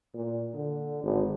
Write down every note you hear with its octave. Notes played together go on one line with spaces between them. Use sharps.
A#2
D3
G#1